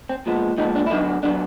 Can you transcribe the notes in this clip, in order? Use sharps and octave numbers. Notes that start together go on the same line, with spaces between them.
C4
A#2 F3 G#3 B3
A#2 F3 G#3 B3 D#4
D4
E4
D3 F#3 B3 D#4
D3 F#3 B3 D4